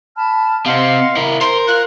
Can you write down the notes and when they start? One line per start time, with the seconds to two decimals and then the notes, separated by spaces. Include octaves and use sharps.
0.16 A5 B5 F6
0.66 C3 C4 D#5 F5 F#5 C6
1.17 E4 A#4
1.41 A#4 C5 C6
1.68 F4 F#6